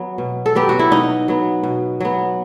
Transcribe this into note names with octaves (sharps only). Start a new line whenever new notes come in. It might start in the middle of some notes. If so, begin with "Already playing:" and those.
Already playing: F#3 B3
B2
A4
F#3 B3 G4
F#4
E4
B2 D#4
F#3 B3
B2
F#3 B3